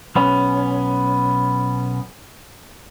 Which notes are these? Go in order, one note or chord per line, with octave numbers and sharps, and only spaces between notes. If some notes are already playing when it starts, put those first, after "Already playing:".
B1 B3 C#4